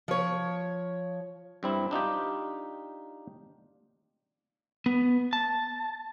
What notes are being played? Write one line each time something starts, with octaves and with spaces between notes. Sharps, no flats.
F3 C#5
G2 C4 E4
D4 D#4 F4 G4
B3
A5